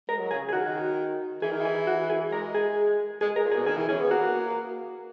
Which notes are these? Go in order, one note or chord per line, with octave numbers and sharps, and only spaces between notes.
G#3 A#4
F#3
C#3 G#4
G#4
D#3 F#4
E3 G#4
D#3
E3 G#4
F#4
G#4
G#3 A#4
G#4
G#3 G#4
A#4
A#2
G#4
B2
D#3 G#4
E3
C#4 G#4
B3
A#3 F#4